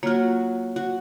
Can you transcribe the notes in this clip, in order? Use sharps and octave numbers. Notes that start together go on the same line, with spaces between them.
F#3 A#3 F4 F#4
F#4